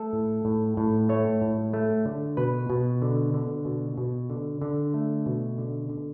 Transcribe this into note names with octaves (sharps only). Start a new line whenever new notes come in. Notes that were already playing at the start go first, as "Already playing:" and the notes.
Already playing: A3 A4
A2
A2
A2
A3 C#5
A2
A3
D3
B2 B4
B2
D3
D3
B2
B2
D3
D3
A3
B2
D3
D3